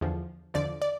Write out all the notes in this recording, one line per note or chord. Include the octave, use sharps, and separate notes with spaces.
E2 D3 F3
E2 D3 F3 D5
D5